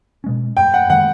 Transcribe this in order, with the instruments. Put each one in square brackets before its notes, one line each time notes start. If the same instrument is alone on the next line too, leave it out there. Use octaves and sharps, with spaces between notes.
[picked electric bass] B2 G#3 C#4
[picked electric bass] F#2 [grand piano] G5
[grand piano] F#5
[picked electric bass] D#3 G#3 [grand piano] F#5